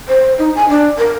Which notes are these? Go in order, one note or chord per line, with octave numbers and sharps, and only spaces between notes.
C5
D#4
G#5
D4
A#4